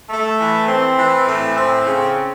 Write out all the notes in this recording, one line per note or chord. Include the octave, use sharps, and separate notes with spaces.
A3
E3
C4
E3
A2
C4
C#3